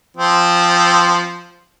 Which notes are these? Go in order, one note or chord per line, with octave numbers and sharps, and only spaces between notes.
F3 C4